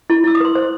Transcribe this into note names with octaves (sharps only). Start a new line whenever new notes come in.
E4
E4 E6
D#6
B4 C6
C5